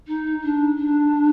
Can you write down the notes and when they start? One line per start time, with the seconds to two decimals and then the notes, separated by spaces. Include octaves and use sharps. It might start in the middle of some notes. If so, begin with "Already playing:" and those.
0.07 D#4
0.43 D4
0.78 D4